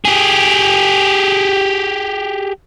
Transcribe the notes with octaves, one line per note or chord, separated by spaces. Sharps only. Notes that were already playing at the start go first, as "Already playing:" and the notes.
G4 G#4